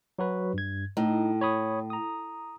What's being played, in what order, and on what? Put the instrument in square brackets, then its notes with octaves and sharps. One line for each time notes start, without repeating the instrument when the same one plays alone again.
[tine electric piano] F#3 F#4 B4
G2 G#6
[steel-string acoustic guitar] A2 [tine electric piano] D#4
[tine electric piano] C#5 B5 D#6
A#5 D#6